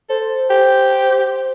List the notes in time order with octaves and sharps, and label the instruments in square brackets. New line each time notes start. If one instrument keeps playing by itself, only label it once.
[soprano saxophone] A4 [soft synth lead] C5
[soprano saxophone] G4 [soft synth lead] C5